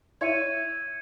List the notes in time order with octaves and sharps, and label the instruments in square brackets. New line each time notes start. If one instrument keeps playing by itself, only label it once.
[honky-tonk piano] E4 C#5 E5 [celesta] G#6 C#7 D#7